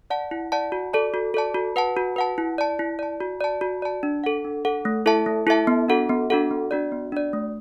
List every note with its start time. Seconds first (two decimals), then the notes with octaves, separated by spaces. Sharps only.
0.10 D5 F#5 A5
0.31 E4
0.52 D5 F#5 A5
0.72 F#4
0.93 A4 D5 A5
1.14 F#4
1.34 A4 D5 A5
1.55 F#4
1.76 B4 F#5 A5
1.97 F#4
2.16 B4 F#5 A5
2.38 E4
2.58 D5 A5
2.79 E4
2.99 D5 A5
3.21 F#4
3.40 D5 A5
3.61 F#4
3.82 D5 A5
4.03 D4
4.24 A4 F#5
4.44 D4
4.65 A4 F#5
4.85 A3
5.06 E4 A4 E5 A5
5.26 A3
5.47 E4 A4 E5 A5
5.67 B3
5.88 D4 F#4 A4 F#5
6.09 B3
6.30 D4 F#4 A4 F#5
6.51 B3
6.71 D4 F#4 D5
6.92 B3
7.12 D4 F#4 D5
7.33 A3